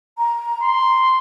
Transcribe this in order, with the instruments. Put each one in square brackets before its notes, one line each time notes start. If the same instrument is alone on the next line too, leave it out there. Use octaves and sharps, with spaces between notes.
[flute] A#5
[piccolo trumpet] C6